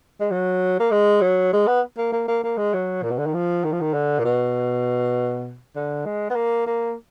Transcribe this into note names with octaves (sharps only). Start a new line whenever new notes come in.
G#3
F#3
A#3
G#3
F#3
G#3
B3
A#3
A#3
A#3
A#3
G#3
F#3
A#2
B2
D3
D#3
F3
D#3
F3
D#3
D3
A#2
B2
D3
G#3
B3
A#3
A#3